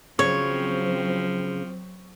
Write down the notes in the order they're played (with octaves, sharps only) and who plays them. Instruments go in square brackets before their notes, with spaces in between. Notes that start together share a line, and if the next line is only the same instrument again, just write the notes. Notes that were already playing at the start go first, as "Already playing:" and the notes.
[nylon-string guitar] C#3 [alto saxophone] F3 [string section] F#3 C4 [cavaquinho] C#5